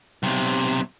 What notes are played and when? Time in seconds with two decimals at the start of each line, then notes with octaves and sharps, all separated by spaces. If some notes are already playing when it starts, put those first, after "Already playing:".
0.23 B1 C3